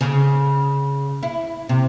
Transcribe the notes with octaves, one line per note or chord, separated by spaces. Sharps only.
C#3
E4
C3